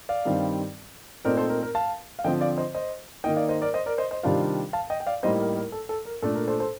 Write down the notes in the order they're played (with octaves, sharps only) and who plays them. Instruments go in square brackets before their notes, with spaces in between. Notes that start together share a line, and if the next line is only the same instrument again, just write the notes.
[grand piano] D5 F5
G2 D#3 G3 C4
A#2 A3 C4 D#4 A#4 D5
A4 C5
A#4
A#4
F5 A5
F5
D3 F3 C4 D#5 G5
D5 F5
C5 D#5
C5 D#5
D#3 A#3 D#4 D#5 G5
D5 F5
C5 D#5
A#4 D5
C5 D#5
A#4 D5
C5 D#5
C5 D#5
C3 D#3 G3 D4 F4 D5 F5
F5 A5
D#5 G5
G5
D5 F5
A2 G3 A#3 D#4 C5 D#5
A#4
A#4
A4
A4
A#4
A#2 A3 D4 A4
A#4
A4 C5
A4 C5